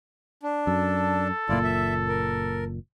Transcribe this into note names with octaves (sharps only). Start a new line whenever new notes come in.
D4
F#2 A4
F#1 A#2 E4 F4 D5
E5
A#4